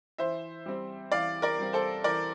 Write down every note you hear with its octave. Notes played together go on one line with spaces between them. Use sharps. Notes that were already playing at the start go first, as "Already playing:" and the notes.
E3 C5 E5
G3 C4
E3 D5 F5
A#4 D5
G3 C4
A4 C5
E3 A#4 D5